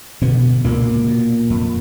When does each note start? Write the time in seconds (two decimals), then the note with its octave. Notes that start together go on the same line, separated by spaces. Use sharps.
0.22 B2 D3 B3
0.64 C#2 A#2 A#3
1.08 B2
1.50 F2